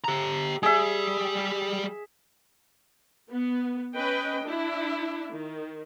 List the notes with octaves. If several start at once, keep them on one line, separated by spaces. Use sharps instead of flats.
G4 A#5
G3 G4 G#4 E5
B3
C#4 B4 D#5 G5
D4 E4
D#3